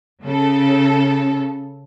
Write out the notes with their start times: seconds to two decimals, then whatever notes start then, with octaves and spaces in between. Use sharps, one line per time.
0.22 C#3 A4